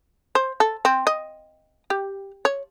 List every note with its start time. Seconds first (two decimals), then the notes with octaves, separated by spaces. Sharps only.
0.35 C5
0.60 A4
0.85 C4
1.07 D#5
1.90 G4
2.45 C#5